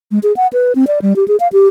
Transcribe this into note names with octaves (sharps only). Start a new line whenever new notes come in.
G#3
G#4
F#5
B4
C4
D5
G3
G4
G#4
F5
G4